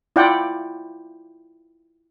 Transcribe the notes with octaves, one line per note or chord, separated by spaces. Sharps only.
E4 F4 D5 F#5 G5